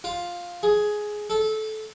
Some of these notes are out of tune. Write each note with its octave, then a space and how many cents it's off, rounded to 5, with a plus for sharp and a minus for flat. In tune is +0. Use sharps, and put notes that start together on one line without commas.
F4 +5
G#4 +10
A4 -20